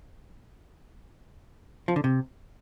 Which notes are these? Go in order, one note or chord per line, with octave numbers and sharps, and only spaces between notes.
F3
D3
C3